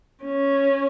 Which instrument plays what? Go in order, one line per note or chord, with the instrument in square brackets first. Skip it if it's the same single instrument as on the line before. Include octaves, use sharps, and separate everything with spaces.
[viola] C#4